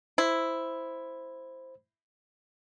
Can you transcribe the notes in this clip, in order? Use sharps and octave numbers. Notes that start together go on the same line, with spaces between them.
E4 C5